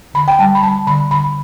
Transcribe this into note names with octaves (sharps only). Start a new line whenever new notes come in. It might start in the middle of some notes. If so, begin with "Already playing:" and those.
D3 B5
G5
G3 A5
B5
G3 A5
D3 B5
D3 B5